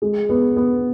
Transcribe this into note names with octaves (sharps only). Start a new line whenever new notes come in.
G#3
B3
B3